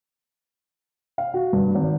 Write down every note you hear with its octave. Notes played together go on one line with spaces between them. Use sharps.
F5
F#4
G2
G#1